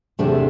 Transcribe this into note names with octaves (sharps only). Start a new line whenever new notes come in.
E2 C3 A3 D4